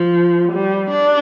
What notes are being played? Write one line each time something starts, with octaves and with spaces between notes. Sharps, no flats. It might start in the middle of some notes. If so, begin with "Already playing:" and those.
Already playing: F3
G3
D4